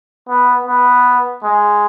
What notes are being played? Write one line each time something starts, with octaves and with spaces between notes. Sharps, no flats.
B3
B3
G#3